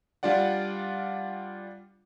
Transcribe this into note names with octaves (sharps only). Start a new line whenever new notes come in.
G3 D4 F4 D5 F#5